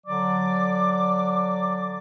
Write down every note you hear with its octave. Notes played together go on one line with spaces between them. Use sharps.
D3 F#3 D5 D6